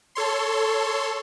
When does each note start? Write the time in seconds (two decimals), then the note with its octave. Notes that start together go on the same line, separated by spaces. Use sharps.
0.15 A4 C#5 C6